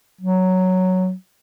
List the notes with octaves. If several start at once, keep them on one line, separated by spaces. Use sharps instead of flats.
F#3